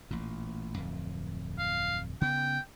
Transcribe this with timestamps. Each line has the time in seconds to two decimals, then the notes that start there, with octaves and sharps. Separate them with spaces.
0.11 A1 A#2
0.77 D1 F2
1.59 F5
2.21 C#3 B3 G5